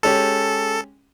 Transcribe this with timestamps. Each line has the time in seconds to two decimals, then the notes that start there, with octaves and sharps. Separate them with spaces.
0.03 G#3 C#4 G4 A4